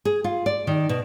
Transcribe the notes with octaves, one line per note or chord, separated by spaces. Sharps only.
G#4
F4
D5
D#3
B2